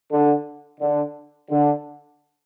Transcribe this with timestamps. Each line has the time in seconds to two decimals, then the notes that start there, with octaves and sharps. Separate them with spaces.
0.12 D3
0.81 D3
1.50 D3